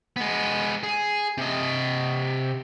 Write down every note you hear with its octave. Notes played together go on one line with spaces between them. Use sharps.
G#3 B3
G#4
C3 D#5